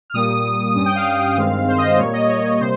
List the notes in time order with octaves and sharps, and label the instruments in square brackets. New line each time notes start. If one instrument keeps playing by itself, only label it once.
[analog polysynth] F6
A#2 G3 A#3 D#6
G2 G3 C#4 D#6
G5
F5
G2 D#3 G#3 C4
C5
D#5
C5
A#2 G3 A#3 C#5
D#5
C#5
C3 G3 A#3 C5